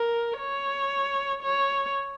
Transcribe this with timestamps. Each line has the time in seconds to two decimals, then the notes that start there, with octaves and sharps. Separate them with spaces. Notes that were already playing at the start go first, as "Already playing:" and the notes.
Already playing: A#4
0.39 C#5
1.43 C#5